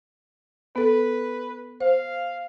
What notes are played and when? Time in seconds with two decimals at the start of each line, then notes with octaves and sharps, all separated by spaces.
0.76 B3 A4 B4
1.81 C5 F5